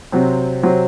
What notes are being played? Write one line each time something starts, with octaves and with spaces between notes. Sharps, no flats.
C3 F#3 C4
C3 F#3 C4